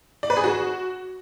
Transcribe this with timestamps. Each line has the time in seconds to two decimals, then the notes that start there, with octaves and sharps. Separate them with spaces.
0.23 D5
0.30 B4
0.37 G#4
0.44 F#4